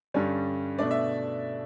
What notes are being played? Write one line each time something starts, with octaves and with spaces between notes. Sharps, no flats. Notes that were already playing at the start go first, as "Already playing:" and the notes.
G2 D3 G3 C#4
B2 A3 D4 D5
E5